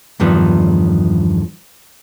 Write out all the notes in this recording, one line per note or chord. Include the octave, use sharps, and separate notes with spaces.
E2 G2 D#3 F3 B3